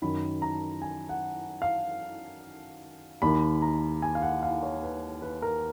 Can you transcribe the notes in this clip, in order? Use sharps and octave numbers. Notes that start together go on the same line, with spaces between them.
F#2 D#3 B5
A#5
G#5
F#5
F5
D#2 D#3 B5
A#5
G#5
F5
F#5
F5
C#5
B4
B4
A#4